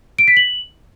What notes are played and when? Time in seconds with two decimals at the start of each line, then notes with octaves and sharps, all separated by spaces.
0.19 D7
0.28 B6
0.37 F#7